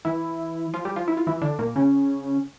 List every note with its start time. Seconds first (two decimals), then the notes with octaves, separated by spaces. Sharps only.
0.05 E3 E4
0.74 F3 F4
0.85 G3 G4
0.96 F3 F4
1.08 E4
1.17 F4
1.27 E3 E4
1.42 D3 D4
1.59 A#2 A#3
1.76 C#3 C#4